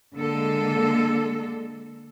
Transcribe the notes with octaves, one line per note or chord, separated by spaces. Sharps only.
D3 G#3 A#3 A4